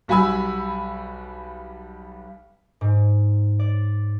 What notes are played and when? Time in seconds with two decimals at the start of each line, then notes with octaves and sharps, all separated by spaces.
0.08 B1 G3 F#4 G#5 B5 E6
2.81 G#2
3.59 D5